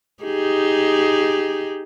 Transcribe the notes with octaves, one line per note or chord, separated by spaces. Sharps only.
D#4 G4 G#4